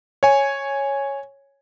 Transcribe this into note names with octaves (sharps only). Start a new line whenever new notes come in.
C#5 G#5